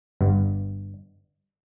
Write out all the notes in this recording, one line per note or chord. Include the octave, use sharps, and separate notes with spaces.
G1 G2